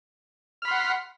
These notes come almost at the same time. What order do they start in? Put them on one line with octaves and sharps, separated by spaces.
F6 B5 C6 F#5